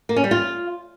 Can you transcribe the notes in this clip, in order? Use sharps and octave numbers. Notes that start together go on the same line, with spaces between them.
A#3
C#4
G3
F4